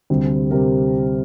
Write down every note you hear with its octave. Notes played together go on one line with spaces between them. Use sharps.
D2 C3 G3 C4
C3 G3 C4 A#4